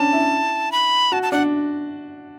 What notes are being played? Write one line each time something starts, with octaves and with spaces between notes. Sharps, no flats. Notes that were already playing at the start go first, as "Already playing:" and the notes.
Already playing: C#4 D4 A5
E4
B5
F#4 A5
A5
D4 F#5